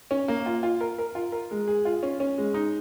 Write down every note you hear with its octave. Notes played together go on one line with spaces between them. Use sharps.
C#4
A#3
F4
F4
A#4
A#4
F4
A#4
G#3
G#4
F4
C#4
C#4
G#3
D#4